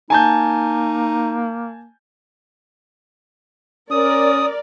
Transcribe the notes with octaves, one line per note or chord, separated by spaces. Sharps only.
A#3 D#4 G#5 A5 G6
C#4 A#4 D5 D#6